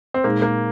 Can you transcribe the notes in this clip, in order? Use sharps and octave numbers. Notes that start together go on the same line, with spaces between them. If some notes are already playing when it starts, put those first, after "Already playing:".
C4
A#2 G#3 A#3 D#4 G#4
A#3